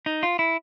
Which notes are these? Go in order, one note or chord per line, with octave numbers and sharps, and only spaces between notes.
D#4
F4
E4